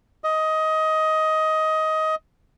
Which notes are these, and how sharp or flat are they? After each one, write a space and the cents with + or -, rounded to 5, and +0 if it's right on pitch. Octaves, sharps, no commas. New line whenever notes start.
D#5 +15